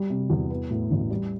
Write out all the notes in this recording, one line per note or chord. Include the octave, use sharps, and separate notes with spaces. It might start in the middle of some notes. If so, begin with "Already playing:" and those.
Already playing: G3
C3
E2
B3
A2
A1
G3